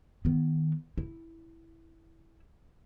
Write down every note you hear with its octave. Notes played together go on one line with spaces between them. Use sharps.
D#3 B3
E4